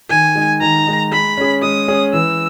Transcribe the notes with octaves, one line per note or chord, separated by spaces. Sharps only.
D#3 G#5
G#3 D#4
D#3 A#5
G#3 D#4
G#3 B5
C#4 G#4
G#3 D#6
C#4 G#4
E3 E6